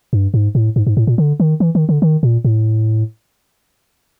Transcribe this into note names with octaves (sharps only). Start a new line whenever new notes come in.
G2
G#2
A2
G#2
G#2
A2
A#2
D3
D#3
E3
D#3
D3
D#3
A#2
A2